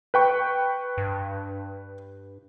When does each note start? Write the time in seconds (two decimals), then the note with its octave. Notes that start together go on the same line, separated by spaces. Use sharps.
0.14 B4 G5 C#6
0.97 G2